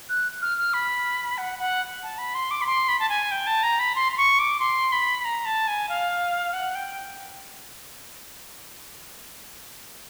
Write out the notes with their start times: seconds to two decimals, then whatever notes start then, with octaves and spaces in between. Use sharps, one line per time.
0.09 F#6
0.42 F6
0.58 F6
0.74 B5
1.38 F#5
1.59 F#5
2.03 A5
2.18 B5
2.35 C6
2.51 D6
2.62 B5
2.66 C6
2.88 B5
3.00 A5
3.09 G#5
3.31 G5
3.47 A5
3.63 A#5
3.79 B5
3.95 C6
4.12 C6
4.18 C#6
4.39 D6
4.60 C6
4.92 B5
5.25 A#5
5.45 A5
5.67 G#5
5.89 F5
6.53 F#5
6.75 G5